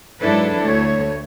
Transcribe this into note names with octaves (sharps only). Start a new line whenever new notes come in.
G#2 F#3 D4 E4 A4 B4
D2 A3 C#5